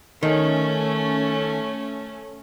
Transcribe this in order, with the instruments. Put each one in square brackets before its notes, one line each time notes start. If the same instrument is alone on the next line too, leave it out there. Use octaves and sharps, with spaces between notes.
[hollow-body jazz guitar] D#3 [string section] A3 C#4